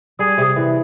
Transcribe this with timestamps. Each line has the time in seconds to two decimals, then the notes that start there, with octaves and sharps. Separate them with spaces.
0.19 G3 G#4
0.38 C3
0.56 E3